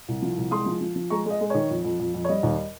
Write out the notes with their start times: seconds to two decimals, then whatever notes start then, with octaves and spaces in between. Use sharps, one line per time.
0.08 C2
0.22 F3
0.37 C2
0.51 G#3 C6 D#6
0.66 F3
0.81 F3
0.96 F3
1.10 G#3 A#5 C#6
1.26 G#3 D#5
1.41 G#3
1.50 D#3 C#5
1.70 F2
1.85 F2
2.00 F2
2.14 F2
2.25 C#5
2.29 G3 D#5
2.43 D#2